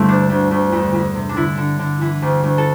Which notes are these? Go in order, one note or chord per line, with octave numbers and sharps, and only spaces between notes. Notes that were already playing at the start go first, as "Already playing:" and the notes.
Already playing: G2 D3 A3 C4 E4 A4
D2 D4
D2
D2
E2
E2
C3
D4
D3 E4
D3
D3
E3
D2
D2
A4